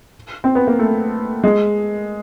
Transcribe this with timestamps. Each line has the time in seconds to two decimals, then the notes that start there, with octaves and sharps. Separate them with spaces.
0.44 C4
0.55 B3
0.67 A#3
0.79 A3
1.44 G#3